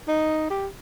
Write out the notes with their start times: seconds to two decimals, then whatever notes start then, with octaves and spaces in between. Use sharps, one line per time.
0.08 D#4
0.50 G4